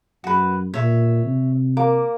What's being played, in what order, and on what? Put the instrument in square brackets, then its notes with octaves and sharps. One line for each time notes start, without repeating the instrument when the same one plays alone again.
[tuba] F#2 [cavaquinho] F#4 B4
[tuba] A#2 [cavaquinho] C#5 E5
[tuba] C3
[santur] A#3 [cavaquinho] D6